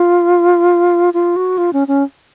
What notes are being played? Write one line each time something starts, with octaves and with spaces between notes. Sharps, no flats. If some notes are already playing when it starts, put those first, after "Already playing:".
Already playing: F4
F4
F#4
F4
C#4
C#4